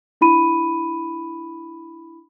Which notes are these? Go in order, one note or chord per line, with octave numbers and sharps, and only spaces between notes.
D4 E4 B5 D#7